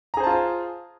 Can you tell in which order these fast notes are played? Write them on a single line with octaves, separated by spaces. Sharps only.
A#5 G#4 C5 A5 F4